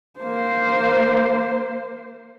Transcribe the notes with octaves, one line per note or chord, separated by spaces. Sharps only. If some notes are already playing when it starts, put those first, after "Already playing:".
A#3 C5